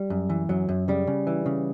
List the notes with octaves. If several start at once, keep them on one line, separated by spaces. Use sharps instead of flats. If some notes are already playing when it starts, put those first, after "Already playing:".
Already playing: G3
F#2
E3
F#2 F#3
F#2
C#3 G3
C#3
E3
C#3